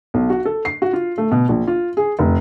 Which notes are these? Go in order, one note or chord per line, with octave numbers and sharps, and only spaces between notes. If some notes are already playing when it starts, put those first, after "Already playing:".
B1
F#4
A4
C7
F#4
F4
A3
B2
A#1
F4
G#4
F1